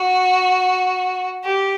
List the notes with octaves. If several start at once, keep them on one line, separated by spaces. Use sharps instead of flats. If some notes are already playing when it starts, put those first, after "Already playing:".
Already playing: F#4
G4